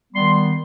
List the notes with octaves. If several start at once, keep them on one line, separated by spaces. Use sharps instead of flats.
D#3 G3 B3 C6